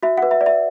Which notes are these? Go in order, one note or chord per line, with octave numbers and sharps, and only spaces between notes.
F#4 E5
B4 F#5
E5
D5
E5